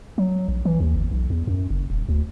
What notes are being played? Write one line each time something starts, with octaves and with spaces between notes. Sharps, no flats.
F#3
A#1
E3
D#2
G1
B1
E2
F#2
F#1
D#1
D2